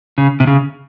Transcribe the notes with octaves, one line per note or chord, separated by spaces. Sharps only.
C#3
C3
C#3